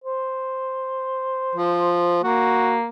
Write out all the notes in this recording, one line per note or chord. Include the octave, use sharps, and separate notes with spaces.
C5
F3
A#3 F#4